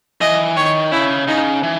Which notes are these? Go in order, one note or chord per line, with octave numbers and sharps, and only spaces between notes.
E3 D#5
D#3 C#5
C#3 E4
C#3 D#4
E3